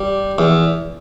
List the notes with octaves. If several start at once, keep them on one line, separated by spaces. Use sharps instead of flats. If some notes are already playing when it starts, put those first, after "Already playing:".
Already playing: G3
E2